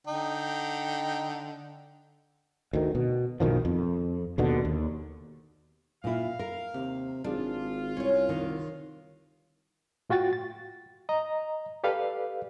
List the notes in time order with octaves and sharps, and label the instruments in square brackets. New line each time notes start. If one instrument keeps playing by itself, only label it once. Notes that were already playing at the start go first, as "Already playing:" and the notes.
[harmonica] D3 D#4 G5
[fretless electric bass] D2 D#3
B2
B1 B2 D#3 F3
F2
D#2 B2 D3
D#2
[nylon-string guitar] A#2 E4 [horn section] F5
[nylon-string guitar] A#4
[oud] D#2 [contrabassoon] C3
[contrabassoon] G#1 [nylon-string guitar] G#3 [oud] D4 [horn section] F4
[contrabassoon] C2 [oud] C#4 C#5
[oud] D3 F5 [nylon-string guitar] D#3
[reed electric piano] A2 F4 F#4 G5 A6
A6
D#5 A#5
G4 A4 B4 D5 F5